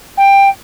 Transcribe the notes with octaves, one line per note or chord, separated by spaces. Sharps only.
G5